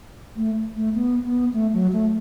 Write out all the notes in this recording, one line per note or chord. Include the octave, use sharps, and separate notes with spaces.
A3
A3
B3
B3
A3
F#3
A3